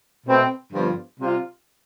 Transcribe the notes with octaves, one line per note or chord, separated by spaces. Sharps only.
B2 A3 C4
G2 D3 F3 B3 F4
C3 G3 C4 F4